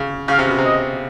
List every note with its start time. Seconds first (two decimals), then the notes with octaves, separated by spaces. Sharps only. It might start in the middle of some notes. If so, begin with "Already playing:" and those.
Already playing: C#3
0.28 C#3 F5
0.39 C3
0.48 B2
0.58 C3
0.65 D#5